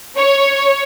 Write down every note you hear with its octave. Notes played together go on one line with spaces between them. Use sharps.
C#5